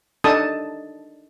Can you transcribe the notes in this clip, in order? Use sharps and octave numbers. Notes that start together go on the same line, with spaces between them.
D4 D#4 A4 A5 D#6